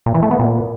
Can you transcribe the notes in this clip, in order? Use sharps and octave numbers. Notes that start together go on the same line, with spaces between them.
A#2
E3
A3
B3
A#2